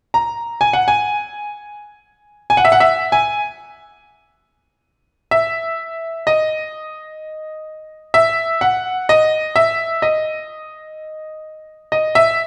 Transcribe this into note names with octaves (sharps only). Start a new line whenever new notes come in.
A#5
G#5
F#5
G#5
G#5
F#5
E5
F#5
E5
G#5
E5
D#5
E5
F#5
D#5
E5
D#5
D#5
E5